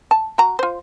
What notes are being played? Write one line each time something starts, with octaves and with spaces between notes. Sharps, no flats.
A5
F#4 F#5 A#5
F4 C5